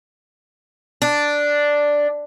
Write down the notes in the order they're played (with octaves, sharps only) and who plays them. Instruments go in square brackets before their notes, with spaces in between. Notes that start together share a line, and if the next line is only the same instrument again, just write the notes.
[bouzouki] D4